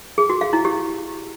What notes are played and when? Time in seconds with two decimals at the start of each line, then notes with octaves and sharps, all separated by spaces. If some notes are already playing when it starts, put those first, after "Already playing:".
0.18 G#4
0.30 F#4
0.41 F5
0.53 E4
0.65 G4